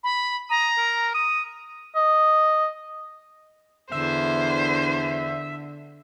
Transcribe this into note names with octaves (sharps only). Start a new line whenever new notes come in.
B5
A#5 D#6
A#4
D#6
D#5
E2 D3 C5 E5